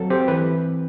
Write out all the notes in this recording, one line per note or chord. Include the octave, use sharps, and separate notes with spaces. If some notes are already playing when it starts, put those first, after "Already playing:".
Already playing: F#3 C4 A4
C4 G4
E3 B4